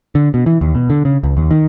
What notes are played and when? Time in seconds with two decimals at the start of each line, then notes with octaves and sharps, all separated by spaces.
0.15 D3
0.34 B2
0.46 E3
0.61 D#2
0.75 B2
0.90 D3
1.05 C#3
1.23 C#2
1.37 D#2
1.51 D#3